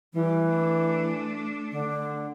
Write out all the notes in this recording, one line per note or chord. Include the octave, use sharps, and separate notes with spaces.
E3 G3
A3 D4
D3